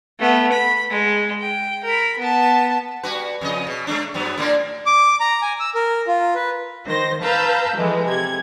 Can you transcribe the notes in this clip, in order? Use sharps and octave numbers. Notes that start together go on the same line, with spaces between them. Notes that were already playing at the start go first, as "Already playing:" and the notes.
A3 B3
B5
G#3
G5
A#4 B5
B3 A5
G3 F#4 B4
F2 C#3 D#5
B2
G#3 A3 D4
G2 F#3 B3
A2 A#3 D4
D6
A#5
G#5
E6
A#4
F4
B4
D#3 C5 A#6
B4 F5 A5 A#5 E6 G6
E3 F3 G#3 A3
C3 G#6